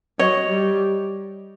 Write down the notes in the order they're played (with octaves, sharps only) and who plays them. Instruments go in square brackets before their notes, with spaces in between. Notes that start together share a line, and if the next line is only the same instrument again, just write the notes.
[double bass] F#3 [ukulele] C#5 D#5
[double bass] G3